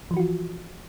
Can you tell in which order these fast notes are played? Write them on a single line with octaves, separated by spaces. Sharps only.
F3 E3 F#4 F4